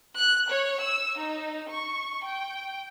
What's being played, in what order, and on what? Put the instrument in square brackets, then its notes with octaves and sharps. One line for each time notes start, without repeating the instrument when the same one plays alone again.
[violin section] F#6
C#5
E6
D#4
C#6
G5